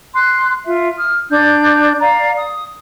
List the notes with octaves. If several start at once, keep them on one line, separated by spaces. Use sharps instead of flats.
C6 F#6
F4 E5
D#6 F6
D4 D5 G6
D5 F5 A#5
D#6